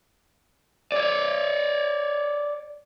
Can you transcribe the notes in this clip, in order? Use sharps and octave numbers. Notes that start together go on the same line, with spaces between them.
C#5 D5